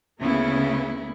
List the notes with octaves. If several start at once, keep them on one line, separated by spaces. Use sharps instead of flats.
D2 C#3 A#3 B3 E4